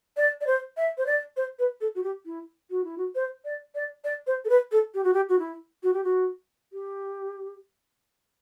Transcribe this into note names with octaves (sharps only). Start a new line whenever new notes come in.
D5
D5
C5
E5
C5
D5
C5
B4
A4
F#4
G4
E4
F#4
E4
F#4
C5
D5
D5
D5
C5
A4
B4
A4
G4
F#4
G4
F#4
E4
F#4
G4
F#4
G4